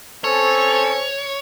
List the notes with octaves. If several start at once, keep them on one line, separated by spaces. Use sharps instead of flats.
C4 C#4 A4 C5 C#5